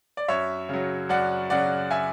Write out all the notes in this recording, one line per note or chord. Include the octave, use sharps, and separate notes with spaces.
D5
F#2 C#5 E5
C#3 F#3
F#2 D5 F#5
C#3 F#3 D5 F#5
E5 G#5